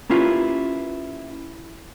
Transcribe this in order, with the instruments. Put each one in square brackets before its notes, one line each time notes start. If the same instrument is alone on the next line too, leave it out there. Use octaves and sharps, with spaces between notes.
[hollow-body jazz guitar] A#3 C#4 E4 F4 G4 B4